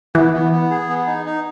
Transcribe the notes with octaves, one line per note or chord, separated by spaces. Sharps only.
E3 B3
B3
B3
G#4
B3
D#4
D#4